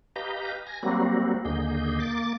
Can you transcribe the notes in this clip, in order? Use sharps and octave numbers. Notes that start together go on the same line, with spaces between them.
G4 B4 D#5 F5 A#5 G6
G#5 A#6
F#3 G3 A#3 C4 F#4
D#2 D3 A#3 G#4 D#5 G6
A#3 D6 A6